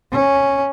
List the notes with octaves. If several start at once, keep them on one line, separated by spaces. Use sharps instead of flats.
C#4